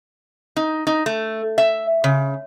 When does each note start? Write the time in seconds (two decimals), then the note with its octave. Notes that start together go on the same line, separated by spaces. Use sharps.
0.56 D#4
0.87 D#4
1.06 A3
1.58 E5
2.04 C#3